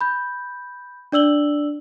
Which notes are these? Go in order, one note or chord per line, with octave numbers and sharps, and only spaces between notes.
B5 G6
D4 D5 E6 F#7 G7